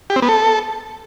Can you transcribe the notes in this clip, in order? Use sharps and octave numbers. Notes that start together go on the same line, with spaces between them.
G4
C4
B3
A4